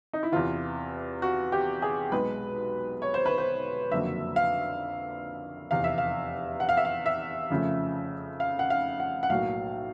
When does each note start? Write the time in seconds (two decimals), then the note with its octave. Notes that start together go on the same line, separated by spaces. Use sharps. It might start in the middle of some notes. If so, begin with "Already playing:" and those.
0.13 D#4
0.23 E4
0.32 E2 C3 E3 F4
1.22 F#4
1.52 G4
1.82 G#4
2.12 B1 B2 G#3 B4
3.02 C#5
3.14 C5
3.26 B4
3.38 C5
3.91 F#1 F2 D3 F#3 A#3 E5
4.36 F5
5.70 F1 E2 C3 F5
5.84 E5
5.98 F5
6.60 F#5
6.69 F5
6.77 E5
6.85 F5
7.06 E5
7.50 F2 C#3 F3 A3
8.40 F5
8.59 F#5
8.70 F5
9.00 F#5
9.23 F#5
9.29 B1 A2 F#3 A#3 F5